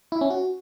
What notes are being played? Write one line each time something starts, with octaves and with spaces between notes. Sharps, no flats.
E4
C#4
F#4